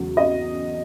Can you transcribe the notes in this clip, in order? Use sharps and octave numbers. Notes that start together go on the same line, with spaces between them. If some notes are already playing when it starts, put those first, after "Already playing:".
Already playing: E2 C#3 F#3 A3
D#5